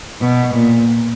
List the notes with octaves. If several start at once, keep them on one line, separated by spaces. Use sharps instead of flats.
B2
A#2